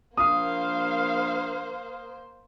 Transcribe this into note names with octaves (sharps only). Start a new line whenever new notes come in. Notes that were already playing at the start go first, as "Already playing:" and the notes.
A#1 A#3 C5 F5 D#6